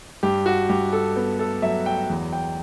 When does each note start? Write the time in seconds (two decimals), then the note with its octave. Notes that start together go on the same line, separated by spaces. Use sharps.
0.23 G2 G4
0.46 F#4
0.69 G2 G4
0.93 A4
1.16 B3
1.39 A4
1.62 F#3 E5
1.86 G5
2.09 E2
2.33 G5